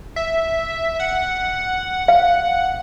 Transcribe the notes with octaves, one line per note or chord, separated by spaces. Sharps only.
E5
F#5
F5